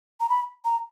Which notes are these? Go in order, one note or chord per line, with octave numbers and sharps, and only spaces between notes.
A#5
B5
A#5